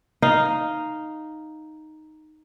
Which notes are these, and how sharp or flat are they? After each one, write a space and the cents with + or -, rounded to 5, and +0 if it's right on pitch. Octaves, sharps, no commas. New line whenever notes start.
D#4 +0 F5 +0